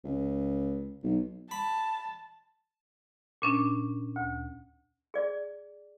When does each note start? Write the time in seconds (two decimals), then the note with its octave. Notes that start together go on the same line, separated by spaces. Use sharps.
0.04 C#2
1.03 B1
1.51 A5 B5
3.42 A#2 C#4 D4
4.16 D2
5.14 G#4 D5